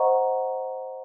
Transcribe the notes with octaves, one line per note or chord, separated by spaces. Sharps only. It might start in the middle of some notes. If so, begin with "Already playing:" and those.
Already playing: C5 D#5 F#5 A#5 C#6